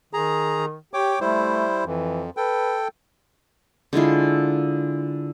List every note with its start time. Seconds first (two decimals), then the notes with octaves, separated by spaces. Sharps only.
0.13 D#3 G#4 A#5
0.94 G4 C#5 G5 D6
1.21 G3 A3 E4 C5
1.86 F2 E3
2.37 A4 B4 G5
3.93 D3 G#3 E4 F4